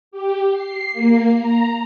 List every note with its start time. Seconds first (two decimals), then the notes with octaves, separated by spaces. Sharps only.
0.11 G4
0.52 C7
0.92 A#3
1.35 A#5